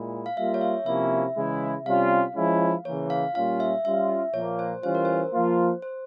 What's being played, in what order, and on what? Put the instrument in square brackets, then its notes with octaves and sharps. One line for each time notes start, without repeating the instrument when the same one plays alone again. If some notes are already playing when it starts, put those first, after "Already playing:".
Already playing: [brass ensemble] A#2 G#3 E4
[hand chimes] F5
[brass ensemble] G3 A#3 F4 [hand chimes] E5
[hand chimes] C#5
E5
[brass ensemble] C3 F3 A#3 C#4 E4 [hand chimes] E5
[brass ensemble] C#3 E3 G#3 E4
[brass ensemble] C3 G3 C#4 F4 [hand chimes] F5
[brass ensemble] F3 G#3 C#4 E4
[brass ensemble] C#3 E3 A#3 [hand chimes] C#5
[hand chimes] F5
[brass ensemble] A#2 G3 A#3 C#4 F4 [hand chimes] F5
[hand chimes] E5
[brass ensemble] G3 C#4 F4 [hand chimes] E5
[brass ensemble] A#2 F3 A#3 [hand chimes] C#5
[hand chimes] C5
[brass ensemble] E3 G3 C#4 F4 [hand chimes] C5
[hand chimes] A#4
C5
[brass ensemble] F3 A#3 F4
[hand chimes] C5